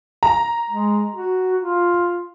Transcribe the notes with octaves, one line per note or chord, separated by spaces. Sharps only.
A#5
G#3
F#4
F4